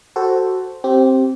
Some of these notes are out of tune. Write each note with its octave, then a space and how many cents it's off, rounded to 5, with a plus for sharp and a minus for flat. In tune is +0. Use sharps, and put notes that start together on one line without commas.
F#4 +10 A4 +0 C5 +0
C4 +10 G4 -20